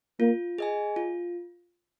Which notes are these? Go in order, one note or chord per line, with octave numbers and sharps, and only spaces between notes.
A#3 F4
G#4 D#5 G#5
F4